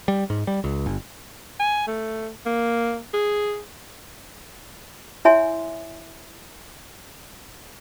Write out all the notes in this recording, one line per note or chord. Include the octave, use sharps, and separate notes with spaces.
G3
G#2
G3
C#2
G1
G#5
A3
A#3
G#4
E4 C#5 E5 G#5 C6